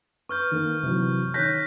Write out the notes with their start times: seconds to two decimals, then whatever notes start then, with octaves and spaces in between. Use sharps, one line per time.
0.29 B4 C#6 F6 G6
0.51 D#3 A#3
0.83 C3 E3 F#3
1.34 D#3 C#5 F#6 G6 A#6 B6